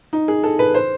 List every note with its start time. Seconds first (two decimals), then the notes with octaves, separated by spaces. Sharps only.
0.13 D#4
0.28 G#4
0.44 A4
0.59 B4
0.74 C5